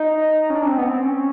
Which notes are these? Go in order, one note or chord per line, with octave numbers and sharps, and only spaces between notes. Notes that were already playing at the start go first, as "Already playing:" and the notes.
Already playing: D#4
C#4
D4
C#4
C4
B3
C4
C#4